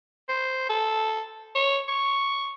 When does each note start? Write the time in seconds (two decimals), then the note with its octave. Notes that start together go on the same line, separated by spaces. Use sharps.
0.29 C5
0.69 A4
1.55 C#5
1.88 C#6